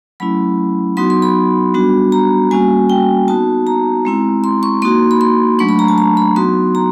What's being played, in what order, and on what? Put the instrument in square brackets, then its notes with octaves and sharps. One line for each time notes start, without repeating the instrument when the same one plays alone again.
[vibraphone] F#3 A3 C#4 E4 B5
F#3 B3 D#4 F#4 C6
C6
B5
G3 B3 D4 F#4
A#5
G3 A#3 C#4 F#4 G#5
G5
B3 D#4 F#4 A5
A#5
G#3 C4 E4
C6
C#6
A#3 D#4 F#4 C6
B5
C6
F#3 A3 D4 C#6
B5
A#5
A5
A#5
B5
F#3 B3 D#4 F#4 C6
A#5